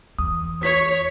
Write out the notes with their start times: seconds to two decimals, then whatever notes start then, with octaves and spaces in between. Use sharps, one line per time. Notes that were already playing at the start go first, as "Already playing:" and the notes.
0.19 E2 D#6
0.63 C#5 B6